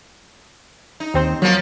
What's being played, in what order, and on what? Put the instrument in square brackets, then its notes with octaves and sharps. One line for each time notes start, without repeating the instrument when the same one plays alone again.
[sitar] D#4
[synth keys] D#2 C4 C5
[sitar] F3 A#3 [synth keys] F#3